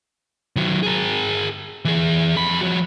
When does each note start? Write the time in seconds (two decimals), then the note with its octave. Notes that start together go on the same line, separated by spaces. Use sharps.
0.56 D#3 F#3
0.83 G#4 A#4
1.85 E3 G#4
2.36 F2 B5
2.61 F3 F#4